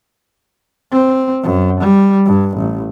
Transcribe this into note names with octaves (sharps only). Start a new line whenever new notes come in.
C4
F#2
G3
G2
A1